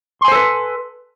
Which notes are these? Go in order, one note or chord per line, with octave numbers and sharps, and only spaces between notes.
A4 B4 C5 G#5 C6